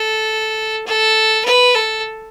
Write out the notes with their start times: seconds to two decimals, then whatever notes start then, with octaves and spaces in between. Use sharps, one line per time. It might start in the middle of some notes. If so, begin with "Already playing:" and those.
Already playing: A4
0.87 A4
1.45 B4
1.75 A4